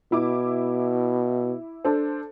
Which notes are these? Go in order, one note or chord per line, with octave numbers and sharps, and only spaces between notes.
B2 E4 D6
D4 A4 C5